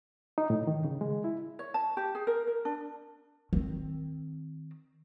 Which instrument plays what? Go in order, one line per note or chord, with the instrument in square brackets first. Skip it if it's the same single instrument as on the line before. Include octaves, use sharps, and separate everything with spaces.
[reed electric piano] D#4
A2
D#3
C#3
G#3
E4
[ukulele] C#5
A5
G4
G#4
A#4
A#4
D4
[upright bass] D#3 C4